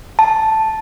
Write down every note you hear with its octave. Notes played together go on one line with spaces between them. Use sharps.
A5